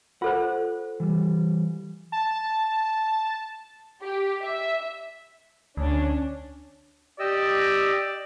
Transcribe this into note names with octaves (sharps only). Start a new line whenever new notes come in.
F4 A4 C5 F#5
E3 G3
A5
G4
E5
D2 C#4 D4
G4 D5 D#5 E6